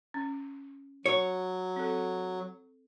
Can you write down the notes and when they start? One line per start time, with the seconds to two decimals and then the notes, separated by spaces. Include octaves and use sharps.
0.14 C#4
1.06 F#3 C#5
1.76 C4 A4